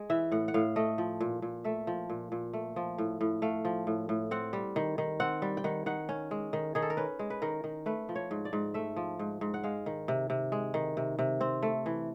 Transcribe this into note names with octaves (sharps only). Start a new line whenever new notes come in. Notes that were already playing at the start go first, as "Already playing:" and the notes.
Already playing: G#3
E3 E5
A2 F#5
F#5
A2 F5
A3 D#5
F3
A#2
A#2
A3 E5
F3
A#2
A#2
A3
F3
A2
A2
A3 F5
F3
A2
A2
C4 F#5
G3
D#3
D#3
C4 F#5
G3
G5
D#3 F#5
D#3 F#5
C#4
G#3
D#3
D#3 G#4
A4
A#4
C#4 B4
G#3
B4
D#3 A#4
D#3
A3 B4
F3
C#5
G#2
D5
G#2
A3 E5
F3
G#2
G#2
F#5
G#3 F5
D#3
C3
C3
G#3
D#3
C3
C3
C4
A3
E3